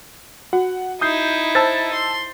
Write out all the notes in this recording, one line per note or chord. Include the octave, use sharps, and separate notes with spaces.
F#4 F#5
D#4 E4 D#6 G6 C7
C5 A5 E6 A6
C6